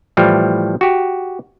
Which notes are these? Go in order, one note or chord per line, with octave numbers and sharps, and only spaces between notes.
A2 E3 F3 G3
F#4 G4